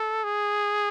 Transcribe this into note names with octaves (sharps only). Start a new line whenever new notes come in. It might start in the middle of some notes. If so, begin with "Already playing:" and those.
Already playing: A4
G#4